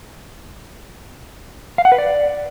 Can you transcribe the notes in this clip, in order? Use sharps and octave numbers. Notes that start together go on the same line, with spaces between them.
F5
F#5
B4
D5